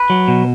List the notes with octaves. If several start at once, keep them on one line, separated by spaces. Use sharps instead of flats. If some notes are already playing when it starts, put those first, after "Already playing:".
Already playing: B4
F#3
B2